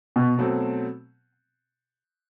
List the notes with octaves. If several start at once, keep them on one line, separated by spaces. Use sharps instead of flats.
B2
B2 F#3 A3 C4